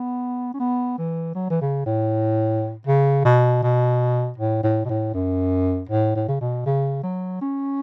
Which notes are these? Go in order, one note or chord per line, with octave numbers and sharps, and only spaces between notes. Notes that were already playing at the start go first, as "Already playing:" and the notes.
Already playing: B3
C#4
B3
E3
F#3
E3
C#3
A2
C#3
B2
B2
A2
A2
B2
A2
F#2
A2
A2
C#3
B2
C#3
F#3
C#4